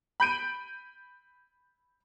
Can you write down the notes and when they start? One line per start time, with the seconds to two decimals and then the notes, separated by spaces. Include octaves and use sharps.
0.20 B5 G6 D7 D#7